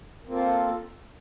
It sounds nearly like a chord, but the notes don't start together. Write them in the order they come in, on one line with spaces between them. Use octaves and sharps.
A#3 C4 F4 A4